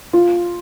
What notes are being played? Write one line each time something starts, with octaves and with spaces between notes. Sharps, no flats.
F4